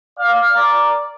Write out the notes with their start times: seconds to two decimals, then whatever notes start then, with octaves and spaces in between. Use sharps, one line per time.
0.19 D5 F5
0.54 A#4 D5